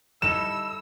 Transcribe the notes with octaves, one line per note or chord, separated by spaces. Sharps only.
G3 D#4 E4 G4 A4 E6 E7